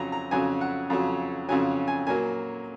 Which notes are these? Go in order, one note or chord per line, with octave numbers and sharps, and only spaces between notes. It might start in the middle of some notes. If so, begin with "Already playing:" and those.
Already playing: F2 C#3 F#3 A#5
A#5
F2 C#3 F#3 G#5
F#5
F2 C#3 F#3
F2 C#3 F#3 G#5
G#5
A#2 F#3 A#3 G#5